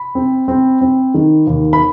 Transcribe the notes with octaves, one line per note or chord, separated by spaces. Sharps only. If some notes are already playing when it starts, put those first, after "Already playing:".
Already playing: B5
C4
C4
C4
D#3
D#2
B5